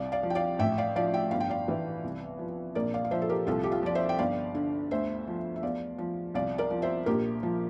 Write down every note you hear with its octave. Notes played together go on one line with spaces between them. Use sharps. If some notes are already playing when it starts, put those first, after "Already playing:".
Already playing: C2 D5 F5
D5 F5
F3
G5
D5 F5
A1 E5 G5
D5 F5
F3 D5 F5
E5 G5
G1 F5
G5
D5 F5
E3
C2
F3
A#1 A#4 D5
D5 F5
F5
F3 C5 E5
A4
G4 A#4
C2 F4 A4
G4
F4
F3 D5
C5 E5
G5
G1 D5 F5
D3
D2 C5 E5
F3
E5
E2 D5 F5
F3
C2 D5 F5
A#4 D5
F3
C5 E5
A#1 G4 A#4
F3